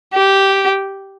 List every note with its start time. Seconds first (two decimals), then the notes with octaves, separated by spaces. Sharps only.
0.13 G4